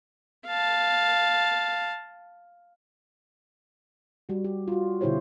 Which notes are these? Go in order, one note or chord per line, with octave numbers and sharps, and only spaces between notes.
F5 A5
G3 F#4
G4
F4 F#4
B2 D3 E4 G4 C5 C#5